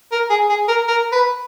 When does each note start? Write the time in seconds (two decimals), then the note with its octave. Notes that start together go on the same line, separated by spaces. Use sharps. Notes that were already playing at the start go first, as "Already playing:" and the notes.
0.12 A#4
0.30 G#4
0.49 G#4
0.68 A#4
0.88 A#4
1.12 B4